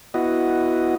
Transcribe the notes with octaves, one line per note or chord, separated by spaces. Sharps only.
B3 E4 F#4 D#5